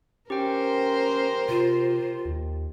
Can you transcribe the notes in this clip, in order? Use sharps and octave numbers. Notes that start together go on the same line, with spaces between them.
C#4 G4 A#4 C5 G5
C3 F4
D#2